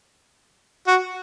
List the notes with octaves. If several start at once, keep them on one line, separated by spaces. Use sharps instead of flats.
F#4